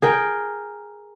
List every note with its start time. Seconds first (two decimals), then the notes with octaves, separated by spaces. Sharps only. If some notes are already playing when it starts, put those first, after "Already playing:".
0.02 G#4 A#4 G5